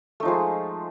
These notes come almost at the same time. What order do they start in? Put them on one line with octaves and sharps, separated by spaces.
A3 D#4 F3 G#3